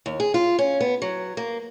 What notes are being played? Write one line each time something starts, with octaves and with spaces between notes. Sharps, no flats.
D#2
G#4
F4
C#4
B3
F#3
A#3